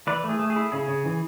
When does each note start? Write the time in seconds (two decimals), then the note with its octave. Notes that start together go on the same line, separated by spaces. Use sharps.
0.07 E3 B4 D5
0.24 A3
0.29 G#4
0.39 A3
0.50 G#4
0.56 E4
0.72 C#3 G#4
0.88 C#3
1.05 E3